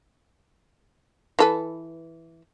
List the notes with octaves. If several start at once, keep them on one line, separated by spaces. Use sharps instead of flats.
E3 A4 B4